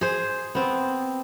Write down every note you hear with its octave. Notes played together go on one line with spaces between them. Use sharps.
G#4 C5
B3 C4